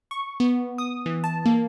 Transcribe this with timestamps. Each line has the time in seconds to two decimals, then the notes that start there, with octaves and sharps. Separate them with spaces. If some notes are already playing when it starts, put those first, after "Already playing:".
0.11 C#6
0.40 B3
0.78 D#6
1.06 E3
1.24 A5
1.46 A#3